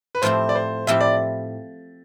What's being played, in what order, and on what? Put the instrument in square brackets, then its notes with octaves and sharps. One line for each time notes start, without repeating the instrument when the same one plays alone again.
[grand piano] B4
[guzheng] A2 F3 C4 E4 G4 [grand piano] C5
[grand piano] D5
C5
[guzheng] A2 F3 C4 E4 G4 [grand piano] E5
[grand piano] D5